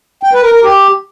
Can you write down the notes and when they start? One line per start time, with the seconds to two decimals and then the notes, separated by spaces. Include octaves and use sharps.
0.23 G5
0.33 B4
0.43 A#4
0.53 A#4
0.63 G4